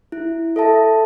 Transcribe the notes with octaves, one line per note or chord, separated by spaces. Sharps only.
E4
A4 E5 A5